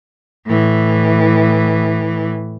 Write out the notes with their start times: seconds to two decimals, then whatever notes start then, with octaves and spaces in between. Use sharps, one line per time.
0.46 A2 E3